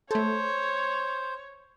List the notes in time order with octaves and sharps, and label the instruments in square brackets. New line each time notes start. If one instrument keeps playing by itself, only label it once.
[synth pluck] A3 A4 [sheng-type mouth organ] C5 [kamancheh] C#5